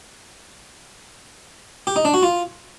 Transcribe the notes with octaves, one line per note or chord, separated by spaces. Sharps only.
G4
D#4
D4
F#4
F4